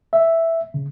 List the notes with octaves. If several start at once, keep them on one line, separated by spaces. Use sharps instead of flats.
E5
C#3